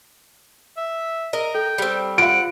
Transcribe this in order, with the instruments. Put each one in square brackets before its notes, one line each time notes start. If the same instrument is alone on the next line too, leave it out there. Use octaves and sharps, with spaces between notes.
[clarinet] E5
[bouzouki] A#4 D#5
[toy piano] A4 [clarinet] G5
[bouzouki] G3 C4
[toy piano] F4 F5 [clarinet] F#5 [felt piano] D7